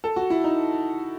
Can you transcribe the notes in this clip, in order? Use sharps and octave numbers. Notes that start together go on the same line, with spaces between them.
A4
F#4
E4
D#4